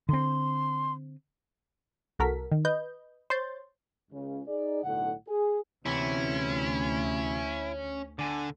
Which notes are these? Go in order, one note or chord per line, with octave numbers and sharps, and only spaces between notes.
D3 C4 C6
C2 F#4 A4 A#4 B6
D#3
B4 D#5 G6
C5 C#5 C6 G6 A6
C#2 C#3
D#4 G#4 D5
B1 A2 D3 F#5
G#4
D2 C3 E3 B3 C#4 E4
D3 D4 G#5